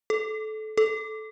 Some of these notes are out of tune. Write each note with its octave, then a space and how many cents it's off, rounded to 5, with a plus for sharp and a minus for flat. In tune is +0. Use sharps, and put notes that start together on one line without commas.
A4 -20
A4 -15